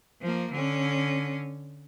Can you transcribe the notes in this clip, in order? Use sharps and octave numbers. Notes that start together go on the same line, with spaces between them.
F3 A#3
D3 C#4